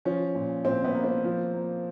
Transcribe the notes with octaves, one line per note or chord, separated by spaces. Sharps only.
F3 C#4
A#2
A#2 C4
B3
A#3
C4
F3
A#3